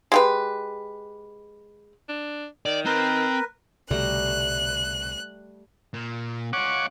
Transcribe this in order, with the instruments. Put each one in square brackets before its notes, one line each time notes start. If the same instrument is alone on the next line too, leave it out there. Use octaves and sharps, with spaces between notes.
[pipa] G#3 G4 B4
[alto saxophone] D4
[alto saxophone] D#3 [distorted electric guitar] D5
[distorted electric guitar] C4 [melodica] A#4 B4
[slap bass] C2 B2 D3 [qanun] G3 A3 A#5 [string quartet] F#6
[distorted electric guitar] A#2
[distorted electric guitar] C#4 F4 [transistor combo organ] F#5 C#6 D6